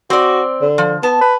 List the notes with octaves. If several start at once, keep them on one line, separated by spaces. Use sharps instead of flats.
C4 F#4 D5
D3
F3
B3 A5
B4